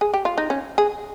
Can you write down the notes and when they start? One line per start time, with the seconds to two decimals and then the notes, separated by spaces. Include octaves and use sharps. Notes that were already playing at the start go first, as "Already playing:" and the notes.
0.01 G#4
0.14 G4
0.25 F4
0.38 D#4
0.50 C#4
0.78 G#4